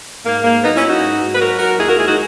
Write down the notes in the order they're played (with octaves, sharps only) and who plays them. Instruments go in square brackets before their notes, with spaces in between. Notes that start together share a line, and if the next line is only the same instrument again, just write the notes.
[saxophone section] G#2 A#3
G#2 A#3
F#3 B3 D#4
C#4 E4
F#3
D#4 F#4
G#2
G#2
B4
F#3 F#4 A#4
F#3 F#4 A#4
D#2 E4 G#4
F#4 A#4
G#3 E4 G#4
D#4 F#4